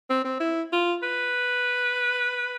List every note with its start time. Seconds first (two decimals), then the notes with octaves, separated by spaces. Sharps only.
0.10 C4
0.25 C4
0.40 E4
0.73 F4
1.03 B4